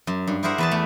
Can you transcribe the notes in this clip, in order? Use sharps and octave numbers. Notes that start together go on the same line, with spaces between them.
F#2
G2
E4 G4 G#4 A#4 C5 F#5
E2 B4 A5
A3